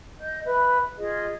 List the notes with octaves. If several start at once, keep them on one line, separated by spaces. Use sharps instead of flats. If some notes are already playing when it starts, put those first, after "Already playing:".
D#5 G6
B4 E5
F4 G#4 D#5